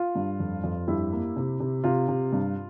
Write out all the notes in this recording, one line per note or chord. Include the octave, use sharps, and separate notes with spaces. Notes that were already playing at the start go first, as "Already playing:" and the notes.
Already playing: F4
G2
F2
F2
G2 E4 G4
A#3
C3
C3
C3 F4
C3
G2